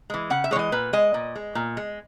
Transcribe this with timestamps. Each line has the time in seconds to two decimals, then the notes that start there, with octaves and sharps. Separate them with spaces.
0.10 E3 G#3
0.30 C#3 F#5
0.44 E5
0.51 G#3 C#5
0.56 E3 D#5
0.72 A#2 B4
0.93 G#3 D#5
1.14 A#2
1.36 G#3
1.55 A#2
1.77 G#3